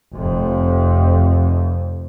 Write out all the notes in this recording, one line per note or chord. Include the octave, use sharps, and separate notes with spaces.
F1 F2